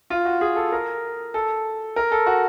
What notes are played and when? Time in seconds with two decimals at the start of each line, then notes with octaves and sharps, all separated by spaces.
0.10 F4
0.25 F#4
0.41 G#4
0.56 A4
0.72 A#4
1.34 A4
1.96 A#4
2.12 A4
2.26 F#4